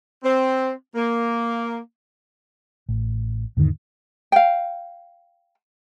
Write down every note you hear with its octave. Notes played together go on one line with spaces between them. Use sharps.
C4
A#3
A1
E2 G#2 D3 D#3
F5 G5